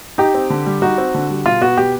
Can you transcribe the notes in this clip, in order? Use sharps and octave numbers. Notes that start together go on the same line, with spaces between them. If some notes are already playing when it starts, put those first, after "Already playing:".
D#4 G4
C4
D3
G3
D#4 F#4
C4
D3
G3
B2 F4
B3 F#4
B2 G4